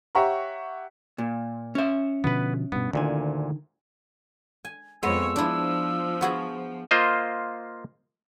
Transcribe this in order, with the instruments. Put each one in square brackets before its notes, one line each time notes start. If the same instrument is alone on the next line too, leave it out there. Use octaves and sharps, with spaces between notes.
[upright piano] G4 C#5 E5 F#5 A#5 C#6
[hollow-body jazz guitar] A#2
C#4 E5
[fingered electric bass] B2 D3 F3 [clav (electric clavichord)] B3 B4
[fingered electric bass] G2 B2 [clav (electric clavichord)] B3
[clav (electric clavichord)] D2 A#2 G#5 [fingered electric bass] D3 D#3
[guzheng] G#5
[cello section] F2 C#5 [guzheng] G#3 B3 [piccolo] E6
[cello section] F3 [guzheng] D4 E4
[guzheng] B3 F#4 G#4
[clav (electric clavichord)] A#3 F4 C5 D#5